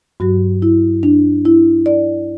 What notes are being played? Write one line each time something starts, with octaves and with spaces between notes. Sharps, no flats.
G2 F#3 F#4
E4
D4
E4
D5